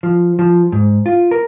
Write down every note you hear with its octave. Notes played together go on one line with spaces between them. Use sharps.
F3
F3
G#2
F4
A#4